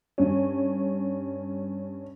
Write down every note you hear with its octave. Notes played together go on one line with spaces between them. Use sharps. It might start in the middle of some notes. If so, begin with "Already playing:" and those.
G2 C#4